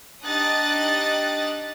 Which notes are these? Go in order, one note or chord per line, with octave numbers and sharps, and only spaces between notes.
D4 D#4 G4 D#6 F#6 A6